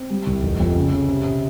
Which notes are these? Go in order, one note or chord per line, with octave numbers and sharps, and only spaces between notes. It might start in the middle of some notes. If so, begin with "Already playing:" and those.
Already playing: C4
G3
C2
F1
F2
C#3
C#3
C3
C3